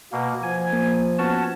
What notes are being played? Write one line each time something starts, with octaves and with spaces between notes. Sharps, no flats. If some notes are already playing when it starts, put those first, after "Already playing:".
B2 A#3
F3 G#5
A#3
B3 C#4 F#4 A5